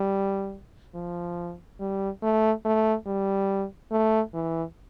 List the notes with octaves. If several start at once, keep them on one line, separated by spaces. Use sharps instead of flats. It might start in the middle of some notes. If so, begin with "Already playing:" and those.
Already playing: G3
F3
G3
A3
A3
G3
A3
E3